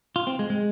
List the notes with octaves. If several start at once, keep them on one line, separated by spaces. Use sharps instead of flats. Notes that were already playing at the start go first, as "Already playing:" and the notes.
F4
C4
G#3
G#3